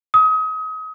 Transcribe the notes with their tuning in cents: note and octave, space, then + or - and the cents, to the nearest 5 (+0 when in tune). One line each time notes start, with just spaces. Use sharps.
D#6 +30